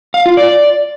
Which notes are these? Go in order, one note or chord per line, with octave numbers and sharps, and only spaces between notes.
F5
F4
D5